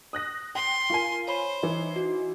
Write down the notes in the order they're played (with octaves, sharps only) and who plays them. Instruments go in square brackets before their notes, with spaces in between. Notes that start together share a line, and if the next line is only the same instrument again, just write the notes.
[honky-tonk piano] D#6 F#6 A#6
[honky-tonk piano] G5 [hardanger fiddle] C6
[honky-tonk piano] F4 A#4 G#5
[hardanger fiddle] C5 [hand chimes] C#5 B5
[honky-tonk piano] E3 D#4
[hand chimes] F#4